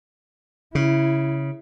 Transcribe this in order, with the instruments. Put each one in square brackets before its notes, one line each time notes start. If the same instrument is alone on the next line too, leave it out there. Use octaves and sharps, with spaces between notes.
[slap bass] C#3 [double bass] E4